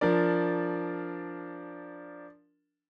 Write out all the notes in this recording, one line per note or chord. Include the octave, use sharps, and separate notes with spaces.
F3 D4 A#4 D5